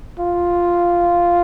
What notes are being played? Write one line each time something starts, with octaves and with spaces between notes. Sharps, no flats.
F4